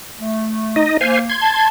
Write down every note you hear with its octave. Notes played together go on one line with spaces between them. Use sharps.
A3
D#4 D#5
A#3 C5 F5 G#5
C6 G#6
A5